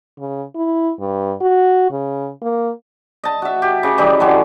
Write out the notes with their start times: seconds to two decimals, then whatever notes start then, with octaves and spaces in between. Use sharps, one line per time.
0.19 C#3
0.55 E4
0.99 G2
1.41 F#4
1.91 C#3
2.42 A#3
3.24 D#5 A5
3.42 F#4 E5
3.62 G4
3.83 C#3
3.98 D#3 E3 G3 D#4
4.20 D3 F#3 C#4